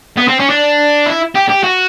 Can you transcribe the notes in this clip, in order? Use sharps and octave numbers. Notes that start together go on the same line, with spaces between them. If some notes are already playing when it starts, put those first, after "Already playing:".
B3
C4
C#4
D4
E4
G4
G4
F#4